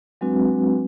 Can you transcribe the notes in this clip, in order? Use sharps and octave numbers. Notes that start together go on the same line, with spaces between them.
F#3 G#3 C4 D4 F#4 B4